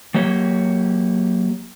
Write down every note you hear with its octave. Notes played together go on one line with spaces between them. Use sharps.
F#3 A#3 G4 C#5